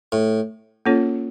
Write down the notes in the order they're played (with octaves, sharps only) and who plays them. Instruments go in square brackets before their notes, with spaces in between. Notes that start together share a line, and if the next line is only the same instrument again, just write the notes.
[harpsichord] A2
[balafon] A#3 C#4 F4 A4 C#5